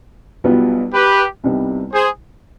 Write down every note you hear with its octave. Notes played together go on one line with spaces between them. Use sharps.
B1 B2 G3 B3 F4
G4 B4
C2 C3 G3 B3 D#4
G#4 C5